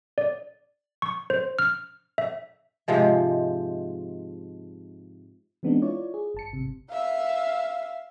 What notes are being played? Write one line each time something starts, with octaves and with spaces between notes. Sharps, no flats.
D5
C#6
C5
F6
E5
G#2 C3 F3 G#3
E3 G#3 B3 C4 D4 D#4
E4 F4 C#5 D5
G#4
G1 A5 C#7
G#1 C3
E5 F5